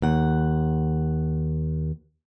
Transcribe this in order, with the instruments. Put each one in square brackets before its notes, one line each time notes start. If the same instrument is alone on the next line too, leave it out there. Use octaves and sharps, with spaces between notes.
[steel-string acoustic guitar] D#2 F#5